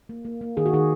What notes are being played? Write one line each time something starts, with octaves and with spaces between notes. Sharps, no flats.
A#3
A#3
A#3
D#3 G#4
F#4
D#3 G#4